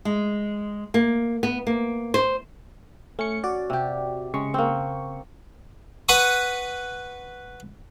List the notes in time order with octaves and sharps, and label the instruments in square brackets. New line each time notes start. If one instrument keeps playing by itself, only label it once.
[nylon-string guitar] G#3
A#3
B3
A#3
C5
[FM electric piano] A3 C#7 [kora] C#4
[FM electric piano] F#4 D5
[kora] C3 G4
[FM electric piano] C#3 C#6 [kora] G#3
[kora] A#3 C4
[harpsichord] B4 F#5 B5 C#6 D#6